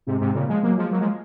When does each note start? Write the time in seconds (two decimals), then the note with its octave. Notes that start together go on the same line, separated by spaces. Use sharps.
0.07 G#2 C3
0.21 G#2 C3
0.34 A#2 C#3
0.48 F3 G#3
0.63 F#3 A#3
0.77 F3 G#3
0.91 F#3 A#3
1.00 F3 G#3